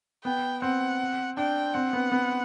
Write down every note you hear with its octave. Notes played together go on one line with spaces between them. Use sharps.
B3 G5
C4 F#5
D4 G5
C4 F#5
B3
B3